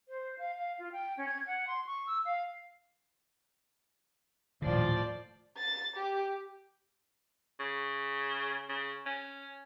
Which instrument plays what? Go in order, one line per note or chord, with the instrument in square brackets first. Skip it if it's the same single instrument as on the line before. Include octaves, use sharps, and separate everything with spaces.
[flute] C5
F5
F5
F4
G5
C#4
G#6
F#5
C6
C#6
E6
F5
[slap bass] D#1 D3 [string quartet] A2 F3 D5
[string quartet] A6
G4
[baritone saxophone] C#3
C#3
C#4